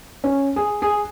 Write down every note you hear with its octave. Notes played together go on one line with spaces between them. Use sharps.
C#4
G#4
G#4